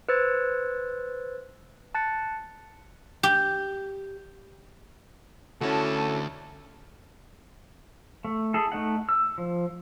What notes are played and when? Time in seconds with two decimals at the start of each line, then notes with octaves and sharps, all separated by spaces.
0.09 B4 C5 E6 G#6 A6
1.95 A5 F#6 A6 C#7
3.23 G4
5.61 D2 C#4 E4 F#4 A4 A5
8.25 A3
8.54 E4 G#4 A4
8.72 A3 D#4 F#5
9.09 E6
9.38 F3